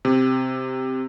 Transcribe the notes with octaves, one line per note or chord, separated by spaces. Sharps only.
C3